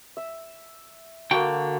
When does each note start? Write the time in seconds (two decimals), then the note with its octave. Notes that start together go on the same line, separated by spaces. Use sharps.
0.17 E5
1.31 D3 A#3 F#4 G5